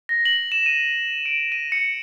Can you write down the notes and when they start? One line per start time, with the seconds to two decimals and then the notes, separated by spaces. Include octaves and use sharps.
0.09 A#6
0.25 F#7
0.52 E7
0.66 D#7
1.26 D7
1.52 D#7
1.72 C#7